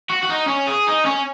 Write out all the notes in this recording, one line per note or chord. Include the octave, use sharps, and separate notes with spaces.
F#4
F#4
D#4
C#4
G#4
D#4
C#4